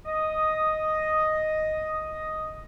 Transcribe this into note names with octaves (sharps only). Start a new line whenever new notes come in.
D#5 D#6